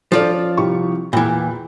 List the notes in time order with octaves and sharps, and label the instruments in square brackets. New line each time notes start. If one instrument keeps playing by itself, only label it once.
[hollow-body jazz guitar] F3 F4 D5 [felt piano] D4 A4 C5
[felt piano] C#4
C2 G4 C#6
[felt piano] E2 G5 B5 [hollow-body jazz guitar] A#2 E3